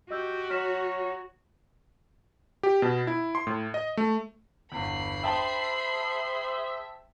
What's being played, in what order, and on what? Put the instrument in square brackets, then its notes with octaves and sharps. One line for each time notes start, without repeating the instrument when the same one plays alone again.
[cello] F#4 [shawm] G4 [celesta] D#5 E6 G6
[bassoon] F#3 [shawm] C#5 [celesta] F6 B6 E7
[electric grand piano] G4
B2
E4
C6
A2
D#5
A3
[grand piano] G1 E2 [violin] B5 C7
[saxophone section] G#4 C5 E5 [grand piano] G5 A5 C6